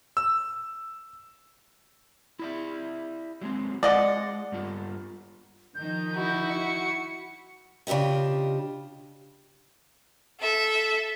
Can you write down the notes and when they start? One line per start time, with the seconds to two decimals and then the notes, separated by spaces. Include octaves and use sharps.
0.17 E6
2.39 E4 D5 E5
3.41 F#3 G#3 C4
3.83 G#3 D5 D#5 F#5
4.52 G2 G3 F4
5.75 D#3 F3 D#4 G6
6.15 E4 F#4
6.49 C#7
7.87 C#3 D4 F4 G4 D#5
10.40 A4 E5